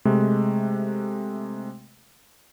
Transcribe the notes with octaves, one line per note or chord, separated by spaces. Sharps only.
C3 G#3 A3